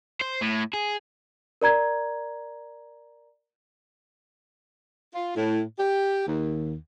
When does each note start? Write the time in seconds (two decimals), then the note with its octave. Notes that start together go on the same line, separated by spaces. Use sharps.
0.21 C5
0.41 A2
0.73 G#4
1.62 A#4 D5 A#5 G#6
5.14 F4
5.35 A2
5.78 G4
6.27 D#2